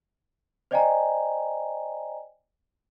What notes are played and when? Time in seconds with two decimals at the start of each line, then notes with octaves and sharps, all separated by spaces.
0.71 C5 D5 D#5 G5 G#5 A#5